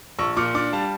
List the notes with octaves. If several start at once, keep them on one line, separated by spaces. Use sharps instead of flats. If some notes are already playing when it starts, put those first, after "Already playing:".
A#1 C#6 E6
A#2 D6 F6
D4 D6 F6
G3 F5 A5